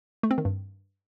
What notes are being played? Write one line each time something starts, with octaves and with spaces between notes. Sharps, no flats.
A3
C4
D#3
G2